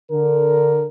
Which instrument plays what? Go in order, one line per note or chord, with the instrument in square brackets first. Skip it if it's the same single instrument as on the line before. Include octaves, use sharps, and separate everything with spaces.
[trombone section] D3 A#4